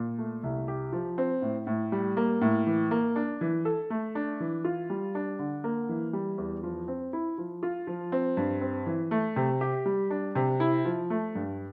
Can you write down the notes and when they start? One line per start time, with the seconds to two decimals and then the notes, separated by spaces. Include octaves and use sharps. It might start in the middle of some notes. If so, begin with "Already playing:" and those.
Already playing: A#2
0.18 A3
0.43 C2
0.68 G4
0.92 F3
1.18 C4
1.42 A2
1.67 A2
1.92 G3
2.17 A#3
2.41 A2
2.67 E3
2.91 A#3
3.16 D4
3.41 E3
3.65 A4
3.90 A3
4.15 D4
4.40 E3
4.64 F4
4.90 G3
5.15 D4
5.39 D3
5.64 A#3
5.89 E3
6.13 G3
6.38 E2
6.63 F3
6.88 C4
7.13 E4
7.38 F3
7.63 F4
7.87 F3
8.12 C4
8.37 G2
8.61 C4
8.86 E3
9.11 A3
9.36 C3
9.61 G4
9.86 G3
10.10 D4
10.35 C3
10.60 E4
10.85 F3
11.10 A3
11.35 G2